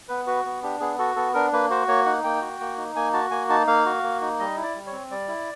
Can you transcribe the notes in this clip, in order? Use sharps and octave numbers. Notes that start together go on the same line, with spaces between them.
B3 B4
F#4 B4
B3
D4 G4
B3 G#4
F#4 A4
B3 A4
D4 A#4
A#3 B4
F#4 C5
A#3 C#5
D#4 F#5
A#3 G5
F#4
A#3
D#4
A#3 G#5
F#4 A5
A#3 G#5
D#4 A5
A#3 F5
F#4
A#3
D#4
G3 D#5
E4
D5
G3
C#5
C4
G3 D5
E4